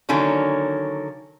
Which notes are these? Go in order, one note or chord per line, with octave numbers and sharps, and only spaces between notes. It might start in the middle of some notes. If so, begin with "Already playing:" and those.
D3 D#3 F#3 A#3 C#4